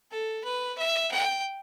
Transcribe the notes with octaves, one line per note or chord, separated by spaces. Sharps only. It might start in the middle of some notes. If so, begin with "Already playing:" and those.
A4
B4
E5
G5